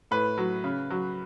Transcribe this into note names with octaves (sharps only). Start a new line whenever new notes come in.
A2 B4
F#3
C#3
F#3